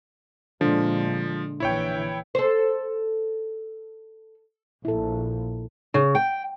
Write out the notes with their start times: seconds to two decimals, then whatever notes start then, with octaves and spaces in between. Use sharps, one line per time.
0.61 A#2 D3 F3 G#3
1.60 A#1 E3 E4 C#5 G5
2.35 A4 C5
4.85 A#1 E4 A4
5.94 C#3
6.15 G5